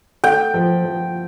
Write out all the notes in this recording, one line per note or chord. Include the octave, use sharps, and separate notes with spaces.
A3 G5
F3
F3